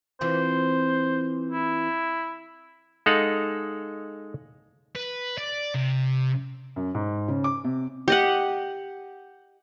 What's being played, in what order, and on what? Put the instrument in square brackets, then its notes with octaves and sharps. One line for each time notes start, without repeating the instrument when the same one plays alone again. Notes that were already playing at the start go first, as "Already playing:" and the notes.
[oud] E3 C4 F4 [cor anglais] C5
[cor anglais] E4
[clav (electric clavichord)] G#3 D#4 A4 F5 F#5
[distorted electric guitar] B4
D5
C3
[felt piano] F#2
G#2
C#3
D6
C3
[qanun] G4 D#5 F#5